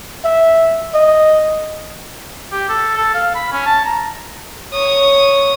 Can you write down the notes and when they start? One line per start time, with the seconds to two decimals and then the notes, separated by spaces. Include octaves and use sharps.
0.25 E5
0.94 D#5
2.52 G4
2.69 A4
2.97 A4
3.14 F5
3.35 B5
3.52 C#4
3.66 A5
3.85 A#5
4.73 C#5 D#6